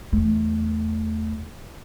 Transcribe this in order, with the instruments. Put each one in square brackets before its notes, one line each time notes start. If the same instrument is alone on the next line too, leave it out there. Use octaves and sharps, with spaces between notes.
[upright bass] E2 A3